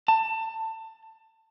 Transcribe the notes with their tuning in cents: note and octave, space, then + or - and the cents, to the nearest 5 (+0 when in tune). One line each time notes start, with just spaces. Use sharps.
A5 +25